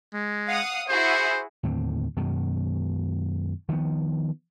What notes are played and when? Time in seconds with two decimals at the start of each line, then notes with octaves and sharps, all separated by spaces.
0.14 G#3
0.48 F5 F#5 D#6
0.89 E4 F#4 G#4 C5
1.63 D#2 A2 D3 C4
2.17 F#2 B2 D#3 G#3
3.69 D#3 F3 G3 B3